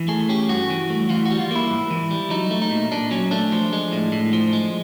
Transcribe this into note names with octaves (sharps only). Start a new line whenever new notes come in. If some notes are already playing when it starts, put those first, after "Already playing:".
Already playing: E3
A3 G#4
C#4 G4
G2 F#4
E3
A3
E3 F4
F#4
G3
F4
A#3 E4
G#2
E3
G3
F#3 D#4
A3
D#4
A#2
A#2 D4
F#3 C#4
A3 D4
F3
G#3
A2
A2
F3
G#3